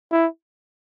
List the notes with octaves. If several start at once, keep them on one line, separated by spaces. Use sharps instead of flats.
E4